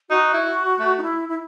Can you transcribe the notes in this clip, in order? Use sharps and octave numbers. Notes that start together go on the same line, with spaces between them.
D#4 F#4
E4
A3
D#4
E4
E4